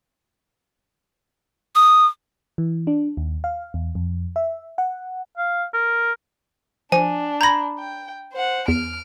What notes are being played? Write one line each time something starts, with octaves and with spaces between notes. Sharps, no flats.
D#6
E3
D4
D#2
F5
E2
F2
E5
F#5
F5
A#4
F3 D4 G#5
A#5 B5 G6 G#6 A#6
G5
C5 F#5
E2 F6 D7